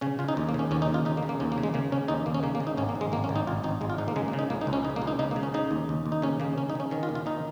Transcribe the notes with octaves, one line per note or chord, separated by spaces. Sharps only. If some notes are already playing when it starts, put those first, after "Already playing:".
C#3 C#4
C#3 F4
D#4
D#2
A#3
C#3 C#4
D#2 C#4
D#4
C#3
F4
C#3 D#4
A#3
C#3
A#3
D#2 C#4
A#3
C#3
G#3
C#3 A#3
C#3 C#4
D#2 D#4
D#2 A#3
C#4
C#3 A#3
A#3
C#3
D#4
G#1 C#4
A#3
G#2
G#3
G#1 A#3
C#4
G#1
D#4
G#1 F4
G#1 D#4
G#1 G#3
F4
G#2 D#4
A#3
C#3 G#3
A#3
C#3
D#4
C#2 A#3
D#4
C#2
C#4
C#3 D#4
A#3
C#2
D#4
C#3 D#4
A#3
C#3
C#4
C#3 D#4
D#2
D#2
D#2
D#4
C#3 C#4
C#3 A#3
C#3 C#4
D#4
C#3 C#4
D#3 C#4
F4
D#2
F4
D#3 D#4